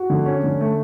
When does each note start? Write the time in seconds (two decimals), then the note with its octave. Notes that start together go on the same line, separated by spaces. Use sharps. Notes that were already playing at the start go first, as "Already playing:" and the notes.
Already playing: F#4
0.10 D3
0.26 C#4
0.44 D3
0.61 A3